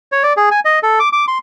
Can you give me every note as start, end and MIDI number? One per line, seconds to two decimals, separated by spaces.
0.12 0.23 73
0.23 0.33 74
0.37 0.49 68
0.51 0.60 80
0.65 0.79 75
0.83 0.99 69
1.00 1.09 86
1.13 1.25 86
1.28 1.38 84